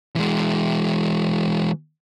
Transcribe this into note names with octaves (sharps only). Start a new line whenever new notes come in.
E3 G#3